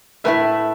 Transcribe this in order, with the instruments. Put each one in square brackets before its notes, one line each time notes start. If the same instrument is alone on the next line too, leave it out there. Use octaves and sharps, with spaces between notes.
[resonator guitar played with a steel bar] A2 A3 E4 [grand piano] B4 E5